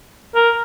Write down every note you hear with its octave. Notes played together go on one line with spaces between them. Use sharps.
A#4